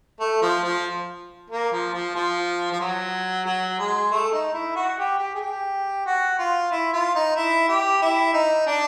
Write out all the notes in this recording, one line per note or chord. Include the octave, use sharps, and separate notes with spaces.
A3
F3
F3
A#3
F3
F3
F3
F3
F#3
F#3
G#3
A3
D#4
E4
F#4
G4
G4
G#4
G4
F#4
F4
E4
F4
D#4
E4
G4
E4
D#4
D4